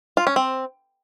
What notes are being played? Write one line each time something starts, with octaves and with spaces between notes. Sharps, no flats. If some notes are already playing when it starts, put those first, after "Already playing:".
F4
C#4
C4